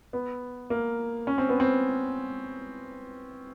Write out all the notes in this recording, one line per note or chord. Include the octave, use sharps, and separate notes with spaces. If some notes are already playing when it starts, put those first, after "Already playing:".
B3
A#3
C#4
C4
B3
C4